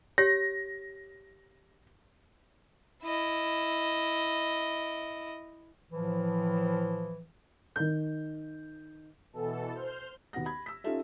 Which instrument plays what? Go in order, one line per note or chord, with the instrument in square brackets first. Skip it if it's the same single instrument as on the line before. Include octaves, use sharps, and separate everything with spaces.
[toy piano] G4 C#5 [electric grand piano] A#6
[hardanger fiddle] E4 D#5
[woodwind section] A2 E3 F3
[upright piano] D#3 G6
[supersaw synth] B2 E3 A4
C5 F6 G6
[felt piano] D#2 B3 F#4 F#5 A#6
B5 G#6
E6 B6
C#4 D#4 F4 G4 A4 E5